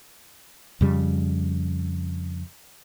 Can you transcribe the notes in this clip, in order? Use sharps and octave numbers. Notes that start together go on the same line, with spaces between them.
F2 C#3 G3